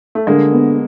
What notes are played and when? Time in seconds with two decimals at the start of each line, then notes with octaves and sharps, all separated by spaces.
0.15 A3
0.27 D3 G#3 A#3
0.52 B3